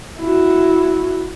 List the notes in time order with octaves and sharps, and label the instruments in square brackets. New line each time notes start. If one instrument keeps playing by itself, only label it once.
[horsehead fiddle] E4 F#4